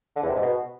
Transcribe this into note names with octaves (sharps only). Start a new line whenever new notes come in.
D3
E2
C3
G#2
B2